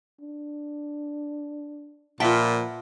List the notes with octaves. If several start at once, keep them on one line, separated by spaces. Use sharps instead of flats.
D4
A#2 F3 F4 B4 E5 F#5 G5 A5